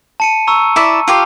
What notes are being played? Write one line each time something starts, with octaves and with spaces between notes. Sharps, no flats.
A5 C#7 D#7
A#5 C#6 E6
E4 D5 E5
F4 G4 F5